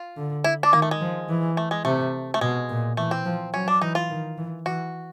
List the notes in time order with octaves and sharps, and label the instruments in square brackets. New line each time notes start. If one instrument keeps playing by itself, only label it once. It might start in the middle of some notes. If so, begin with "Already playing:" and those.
Already playing: [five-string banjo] F4
[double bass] D3
[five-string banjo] E4
D4
[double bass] D#3 [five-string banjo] A#3
[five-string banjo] A3
G#3
[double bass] F3
E3
[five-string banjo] A3
G#3
[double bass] C3 [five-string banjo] A3
[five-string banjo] A3
[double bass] B2 [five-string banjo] G#3
[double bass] A#2
[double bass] E3 [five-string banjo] A3
[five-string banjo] C4
[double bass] F3
[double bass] F#3 [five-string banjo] C#4
[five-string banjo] D4
[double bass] E3 [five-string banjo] D#4
[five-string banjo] F4
[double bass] D#3
E3
[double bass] E3 [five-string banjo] F#4